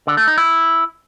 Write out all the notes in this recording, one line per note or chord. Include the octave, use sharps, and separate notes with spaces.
D3
A3
D#4
E4